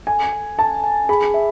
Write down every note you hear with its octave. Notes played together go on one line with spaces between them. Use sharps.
A4 G#5
G#5
A4 A5
G#5
G#4 B5
E5